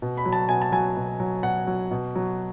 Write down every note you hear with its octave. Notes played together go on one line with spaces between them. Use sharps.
B2
B5
F#3
A5
B2 G#5
A5
F#3 G#5
B2
F#3
B2 F#5
F#3
B2
F#3